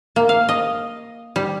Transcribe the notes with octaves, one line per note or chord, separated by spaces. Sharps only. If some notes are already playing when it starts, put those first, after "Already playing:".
A#3
F5
D#5
G3